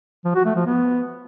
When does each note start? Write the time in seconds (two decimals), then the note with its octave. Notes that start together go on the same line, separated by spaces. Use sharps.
0.25 F3
0.35 F#4
0.45 A3
0.56 F3
0.66 B3